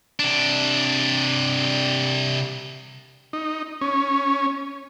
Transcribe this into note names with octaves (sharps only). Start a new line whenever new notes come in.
C3 D4
D#4
C#4